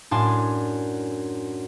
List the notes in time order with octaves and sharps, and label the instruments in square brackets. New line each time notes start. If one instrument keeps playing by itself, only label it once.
[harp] F#2 A2 D4 G#5 A5 C6